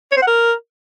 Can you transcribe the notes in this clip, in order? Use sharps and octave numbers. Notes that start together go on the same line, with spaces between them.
C#5
C5
F#5
A#4